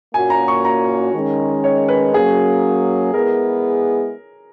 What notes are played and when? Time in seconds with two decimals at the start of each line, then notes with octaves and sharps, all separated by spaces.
0.14 A#2 A#3 C#4 F#4 G#5
0.30 A#5
0.48 C#6
0.65 A#5
1.14 D#3 G#3 C#4
1.64 C#5
1.89 B4
2.14 F#3 A#3 C#4 G#4
3.13 G#3 B3 E4 G#4 A#4